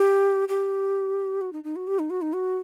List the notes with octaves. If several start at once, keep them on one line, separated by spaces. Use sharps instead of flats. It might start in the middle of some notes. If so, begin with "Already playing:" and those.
Already playing: G4
G4
F#4
D#4
D#4
F#4
G4
D#4
F#4
D#4
F#4